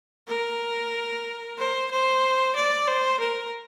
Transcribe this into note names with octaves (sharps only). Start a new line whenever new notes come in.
A#4
C5
C5
D5
C5
A#4